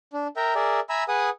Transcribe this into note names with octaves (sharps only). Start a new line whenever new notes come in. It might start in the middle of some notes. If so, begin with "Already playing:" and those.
D4
A#4 E5 G5 A#5
G#4 A#4 D5 E5
E5 G#5 A#5 B5 E6
G#4 B4 F#5 G#5 D#6